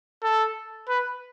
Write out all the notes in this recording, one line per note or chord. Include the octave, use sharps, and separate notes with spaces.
A4
B4